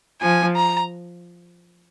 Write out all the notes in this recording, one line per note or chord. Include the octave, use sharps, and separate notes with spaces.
F3 G#5
A#5